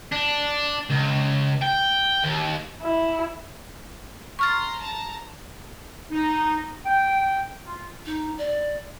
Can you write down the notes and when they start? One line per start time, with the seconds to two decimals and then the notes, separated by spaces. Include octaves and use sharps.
0.12 D4
0.90 C#2
1.61 G5
2.24 D#2
2.82 E4
4.39 A#5 C6 C#6 F6 A6
4.79 A5 A#5
6.11 D#4
6.85 G5
7.65 F4
8.06 D#4
8.38 D5